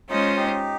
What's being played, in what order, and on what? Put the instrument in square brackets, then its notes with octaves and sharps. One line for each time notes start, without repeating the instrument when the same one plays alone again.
[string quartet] G#3 C#4 F4 C5 D#5 [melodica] D#4
[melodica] D#4 G4